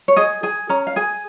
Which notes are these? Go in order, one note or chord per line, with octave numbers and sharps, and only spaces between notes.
C#5
G#4 D#5
G#4 G#5
C#4 A#5
F5
G#4 G#5